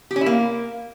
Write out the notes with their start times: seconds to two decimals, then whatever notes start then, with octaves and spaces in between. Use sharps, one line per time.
0.11 G4
0.16 C#4
0.21 E4
0.26 A#3